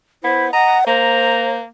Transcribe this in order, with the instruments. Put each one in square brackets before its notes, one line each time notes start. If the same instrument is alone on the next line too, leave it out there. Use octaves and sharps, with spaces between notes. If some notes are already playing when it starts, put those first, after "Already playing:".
[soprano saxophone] B3 [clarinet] E4 [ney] C5
[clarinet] D#5 [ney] F#5 [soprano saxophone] A#5
[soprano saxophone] A#3 [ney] C5 [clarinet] A#5